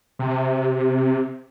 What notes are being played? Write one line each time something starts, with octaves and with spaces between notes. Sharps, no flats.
C3